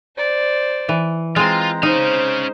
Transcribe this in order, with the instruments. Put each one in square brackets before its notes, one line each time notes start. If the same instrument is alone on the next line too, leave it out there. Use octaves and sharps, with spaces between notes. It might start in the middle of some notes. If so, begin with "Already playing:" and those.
[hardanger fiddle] C5 D5
[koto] E3
[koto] G#3 C4 [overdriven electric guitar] F4 [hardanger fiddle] A#5
[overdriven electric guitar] C#4 F5 [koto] D#4 [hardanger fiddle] C5